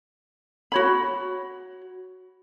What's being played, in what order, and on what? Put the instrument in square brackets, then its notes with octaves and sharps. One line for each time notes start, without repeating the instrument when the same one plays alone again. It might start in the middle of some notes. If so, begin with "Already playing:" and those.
[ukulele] F#4 C#5 B5